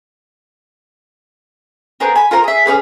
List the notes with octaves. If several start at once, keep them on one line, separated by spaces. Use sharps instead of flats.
B3 C4 G#4 A#4
G#5 B5
F4 A#4 C5 A#5
G#4 E5
C#4 D#4 G#4 B4